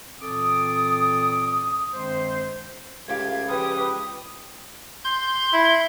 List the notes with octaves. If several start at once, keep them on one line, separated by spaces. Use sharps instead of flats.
A#2 E3 C4 A4 D6 D#6
G2 D#3 G#3 C4 C5
C#2 A3 G4 F5 G#6
F3 G3 G4 B4 D#6
C6 G6
E4